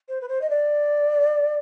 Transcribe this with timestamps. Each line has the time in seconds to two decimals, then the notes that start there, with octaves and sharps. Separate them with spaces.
0.09 C5
0.21 B4
0.29 C5
0.42 D#5
0.50 D5